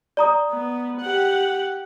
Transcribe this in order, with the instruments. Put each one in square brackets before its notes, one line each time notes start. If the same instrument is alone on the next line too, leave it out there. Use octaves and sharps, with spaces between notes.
[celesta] D5 A#5 D#6
[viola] B3
G4 F#5